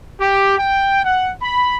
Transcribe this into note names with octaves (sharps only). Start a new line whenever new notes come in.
G4
G5
F#5
B5